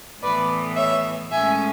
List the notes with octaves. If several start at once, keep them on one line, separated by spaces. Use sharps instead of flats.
A2 E3 B3 B4 D5
C#5 E5
A2 G#3 C#4 E5 G#5